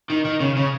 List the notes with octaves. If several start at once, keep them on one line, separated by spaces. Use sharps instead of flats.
D#3
D#3
C#3
C#3